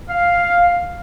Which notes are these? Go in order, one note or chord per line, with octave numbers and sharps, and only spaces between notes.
F5